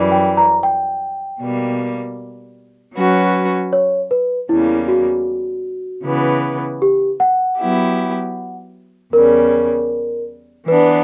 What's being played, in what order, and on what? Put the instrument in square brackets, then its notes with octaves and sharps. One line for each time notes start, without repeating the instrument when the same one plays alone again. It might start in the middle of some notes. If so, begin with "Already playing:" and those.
Already playing: [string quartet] F#2 E3 G3
[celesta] G5
A#5
G5
[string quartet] B2 G3 A#3
F#3 C#4 F#4 B4
[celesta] C#5
B4
[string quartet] E2 C#3 G3 A#3 [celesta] E4
[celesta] F#4
[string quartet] C#3 E3 B3
[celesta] G4
F#5
[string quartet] F#3 B3 E4 G4
[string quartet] E2 C#3 G3 [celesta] A#4
[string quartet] E3 B3 D4 [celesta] B4